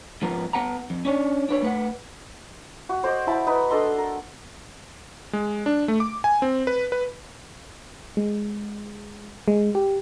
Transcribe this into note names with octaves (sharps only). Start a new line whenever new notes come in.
G#2 F3 B3 A#4
B3 B4 F#5 A5 A#5
F2
C#4 D4 C#5 D5
D4 B4 C#5
A3 B4 F#5
F#4
C5 D5 D#5
E4 A5 B5
D#4 B4
D4 A4 D#5 C6
A#4
G#3
D4
A3
D6
G#5
C4
B4
B4
G#3
G#3
G4